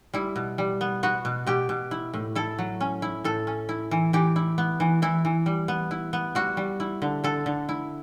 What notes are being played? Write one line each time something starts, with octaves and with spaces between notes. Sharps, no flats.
G3 E4
B2
G3
B3
B3 F#4
B2
B2 G4
B2
E4
A2
E4 A4
F#3
C#4
E4
A2 A4
C#4
E4
E3
E3 G4
E4
B3
E3
E3 E4
E3
G3
B3
E4
B3
G3 F#4
G3
E4
D3
D3 A4
D3
E4